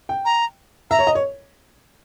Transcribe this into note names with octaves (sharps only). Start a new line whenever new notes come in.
G5
A#5
E5 A#5
C#5
D#5
C#5